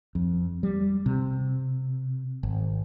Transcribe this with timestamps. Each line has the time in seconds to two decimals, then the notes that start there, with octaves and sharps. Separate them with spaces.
0.15 F2
0.63 G3
1.06 C3
2.43 G#1